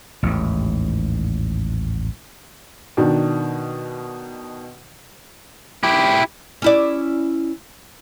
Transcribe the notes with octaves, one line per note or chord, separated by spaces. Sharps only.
A1 D#2 G#2
B2 D#3 D4
E4 G4
C#4 E4 D5